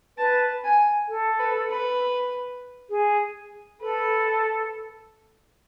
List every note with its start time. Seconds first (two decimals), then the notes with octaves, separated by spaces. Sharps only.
0.18 B4 A5
0.64 G#5
1.08 A4
1.39 B4
1.69 B4
2.90 G#4
3.81 A4 B4